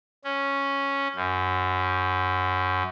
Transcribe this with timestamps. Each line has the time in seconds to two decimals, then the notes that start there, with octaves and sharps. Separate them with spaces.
0.24 C#4
1.16 F#2